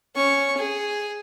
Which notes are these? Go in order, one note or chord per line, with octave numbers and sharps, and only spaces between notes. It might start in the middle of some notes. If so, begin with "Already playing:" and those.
C#4 C#6
G#4